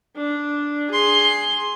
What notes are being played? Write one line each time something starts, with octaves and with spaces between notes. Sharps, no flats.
D4
G#4 C6